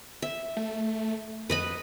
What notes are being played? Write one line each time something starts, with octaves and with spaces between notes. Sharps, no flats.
E5
A3
F2 B4 D#5 B5